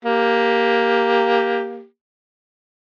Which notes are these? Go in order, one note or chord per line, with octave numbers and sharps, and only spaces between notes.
A#3 G4